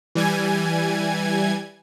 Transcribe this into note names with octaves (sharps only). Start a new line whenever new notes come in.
E3 G3 G#5 G#6